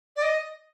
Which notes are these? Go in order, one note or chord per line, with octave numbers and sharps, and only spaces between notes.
D5
D#5